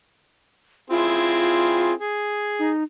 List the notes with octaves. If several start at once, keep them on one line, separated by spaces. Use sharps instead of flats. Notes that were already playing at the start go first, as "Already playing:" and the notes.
C4 E4 F4 G#4
G#4
D#4